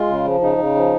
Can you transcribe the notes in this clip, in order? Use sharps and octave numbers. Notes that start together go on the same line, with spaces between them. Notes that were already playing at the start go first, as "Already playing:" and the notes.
Already playing: G#3 F4
C#3
F3
C#3 D#4
C#3
F3